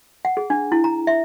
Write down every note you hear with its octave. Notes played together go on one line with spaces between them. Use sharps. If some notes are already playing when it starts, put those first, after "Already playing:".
F#5
G#4
D4
E4
A#5
E5